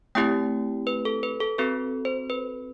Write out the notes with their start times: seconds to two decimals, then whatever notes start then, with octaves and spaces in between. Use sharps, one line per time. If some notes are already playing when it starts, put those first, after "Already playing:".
0.15 A3 C4 E4 G4 G5
0.87 B4
1.05 A4
1.23 B4
1.40 A4
1.58 C4 F#4 A4 B4
2.05 C5
2.30 B4